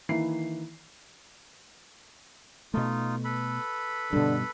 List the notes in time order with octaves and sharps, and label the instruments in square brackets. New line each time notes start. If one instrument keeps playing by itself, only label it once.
[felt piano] D#3 E3 A#3 E4 C7
[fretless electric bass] B2 A3 [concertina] D#4 F4
[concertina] A4 B4 B5
[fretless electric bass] G2 B2 [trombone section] D3